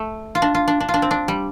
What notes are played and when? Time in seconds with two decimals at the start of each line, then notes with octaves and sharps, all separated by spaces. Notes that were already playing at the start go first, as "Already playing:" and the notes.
Already playing: A3
0.35 F4
0.42 D4
0.55 F4
0.68 D4
0.80 D4
0.89 F4
0.94 D4
1.02 C4
1.11 D4
1.28 G3